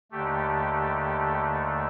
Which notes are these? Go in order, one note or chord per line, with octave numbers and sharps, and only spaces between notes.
D#2 D3 A3 G4